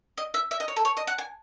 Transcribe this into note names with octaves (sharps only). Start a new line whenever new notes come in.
D#5
E5
E5
D#5
C#5
A4
C#5
D#5
F#5
G#5